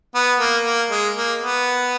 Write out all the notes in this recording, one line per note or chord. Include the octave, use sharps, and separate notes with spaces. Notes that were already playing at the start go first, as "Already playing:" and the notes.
B3
A#3
A#3
G#3
A#3
B3